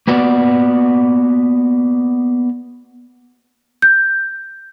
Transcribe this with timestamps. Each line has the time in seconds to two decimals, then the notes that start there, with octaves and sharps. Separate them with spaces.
0.07 A#3 B3 F#4 D5
3.82 G6